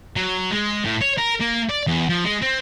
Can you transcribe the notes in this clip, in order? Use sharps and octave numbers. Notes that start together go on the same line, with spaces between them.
F#3
G#3
A2
C#5
A#4
A#3
D5
E2
F3
G#3
C4